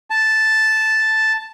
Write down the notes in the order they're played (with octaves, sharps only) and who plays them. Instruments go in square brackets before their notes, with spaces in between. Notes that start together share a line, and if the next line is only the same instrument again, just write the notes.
[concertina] A5